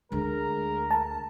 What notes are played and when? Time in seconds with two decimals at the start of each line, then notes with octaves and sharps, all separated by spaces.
0.12 D2 D3 G#3 A#4
0.91 A5